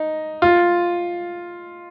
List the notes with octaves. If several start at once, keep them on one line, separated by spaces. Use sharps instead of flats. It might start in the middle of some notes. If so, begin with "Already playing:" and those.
Already playing: D#4
F4